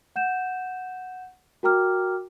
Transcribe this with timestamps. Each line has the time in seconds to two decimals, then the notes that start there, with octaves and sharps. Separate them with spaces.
0.16 F#5 G6 E7
1.63 F#4 A#4 G5 A#5 D6 F6